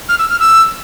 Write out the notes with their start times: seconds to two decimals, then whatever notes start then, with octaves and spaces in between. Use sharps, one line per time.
0.09 F6
0.19 E6
0.29 F6
0.40 E6